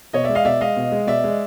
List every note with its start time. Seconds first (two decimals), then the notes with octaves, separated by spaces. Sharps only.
0.13 B2 C#5 D#5
0.24 D5 E5
0.29 G#3
0.35 D#5 F5
0.45 B2 D5 E5
0.61 G#3 D#5 F5
0.77 B2
0.92 G#3
1.07 B2 D5 E5
1.24 G#3